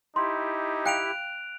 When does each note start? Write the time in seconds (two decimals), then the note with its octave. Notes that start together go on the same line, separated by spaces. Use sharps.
0.16 D#4 E4 G4 C6
0.86 F5 G5 F#6 D7 F7